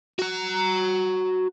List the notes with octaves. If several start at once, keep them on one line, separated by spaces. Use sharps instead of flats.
F#4 A#5